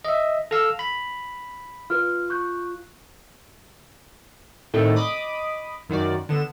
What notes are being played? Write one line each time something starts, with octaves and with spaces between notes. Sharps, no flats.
D#5 E5
A4 F5 E6 A#6 F7
B5
F4 B4 F6
C#6 F#6 G6
A2 D#3 A3 C4 D4 D#4
D#5 B5 D6 D#6
F#2 D#3 F#4 D5
D3 B3 E7